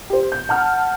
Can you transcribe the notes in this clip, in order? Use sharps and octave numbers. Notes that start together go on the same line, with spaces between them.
G4 C5
G6
F#5 A5 F6